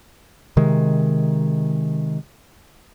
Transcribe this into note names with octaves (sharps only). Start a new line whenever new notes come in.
C3 D#3 G#3